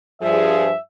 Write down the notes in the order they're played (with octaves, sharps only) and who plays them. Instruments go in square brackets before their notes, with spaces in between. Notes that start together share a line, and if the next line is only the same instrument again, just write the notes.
[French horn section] G2 F3 G#4 [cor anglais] E5